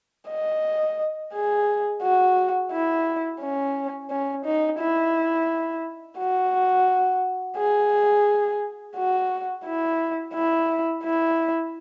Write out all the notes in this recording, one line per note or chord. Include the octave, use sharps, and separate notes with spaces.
D#5
G#4
F#4
E4
C#4
C#4
D#4
E4
F#4
G#4
F#4
E4
E4
E4